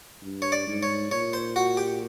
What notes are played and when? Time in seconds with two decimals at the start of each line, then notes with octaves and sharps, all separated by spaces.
0.23 G2
0.42 C#5
0.52 D5
0.67 G#2
0.83 C#5
1.11 A#2 C#5
1.33 C5
1.56 F#4
1.77 G4